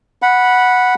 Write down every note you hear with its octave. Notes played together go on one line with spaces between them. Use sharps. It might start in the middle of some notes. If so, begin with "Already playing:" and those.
F#5 B5